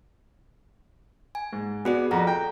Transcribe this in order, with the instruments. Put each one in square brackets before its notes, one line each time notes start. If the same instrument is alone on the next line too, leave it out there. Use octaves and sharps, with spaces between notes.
[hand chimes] G#5
[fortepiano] G#2
[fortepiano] B3 [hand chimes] F#4 G#4 D5
[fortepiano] F2 F#4 [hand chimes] A4 A#5
[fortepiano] G5